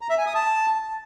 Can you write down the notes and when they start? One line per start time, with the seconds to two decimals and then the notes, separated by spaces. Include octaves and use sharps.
0.01 A#5
0.10 E5
0.18 G#5
0.26 D#6
0.35 A5